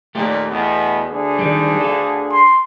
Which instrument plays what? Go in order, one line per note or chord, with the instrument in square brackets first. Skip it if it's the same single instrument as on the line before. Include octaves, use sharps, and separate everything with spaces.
[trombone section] D#2 A#2 [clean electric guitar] A3 G4
[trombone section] E2 B2 B3
D2 D3 G#4
[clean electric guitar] D#3 G3
A4 F5
[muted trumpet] C6